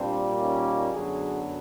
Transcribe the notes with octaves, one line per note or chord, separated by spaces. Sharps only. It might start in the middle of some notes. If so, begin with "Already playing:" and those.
Already playing: A#2 G3 A#3 C4 D4
C#4 D#4
F#2 D3 F#3 B3 F#4 G#4